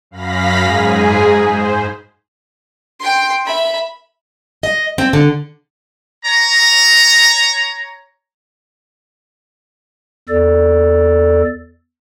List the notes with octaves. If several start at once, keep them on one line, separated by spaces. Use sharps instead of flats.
F#2 F5 B5 A#6 B6
G#2 G#4
C5
G5 C6
E5 B5
D#5
C4
D3
C#5 A#5
E2 A4 D5